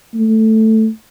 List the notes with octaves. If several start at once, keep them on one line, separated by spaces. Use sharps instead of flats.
A3